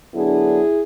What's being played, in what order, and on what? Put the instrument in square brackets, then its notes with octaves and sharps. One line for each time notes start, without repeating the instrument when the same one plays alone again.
[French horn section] D3 F#3 B3 D4 E4 G#4